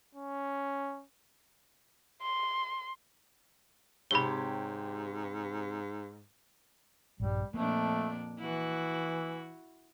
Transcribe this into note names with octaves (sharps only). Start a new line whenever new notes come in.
C#4
C6
G#2 C3 G4 C#5 B5 G7
A#1 G2 G3
F2 A#2 A3 A#3 D4
E3 E4 F#4